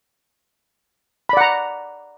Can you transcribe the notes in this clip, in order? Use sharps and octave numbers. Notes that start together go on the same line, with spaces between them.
D5 F#5 A#5 B5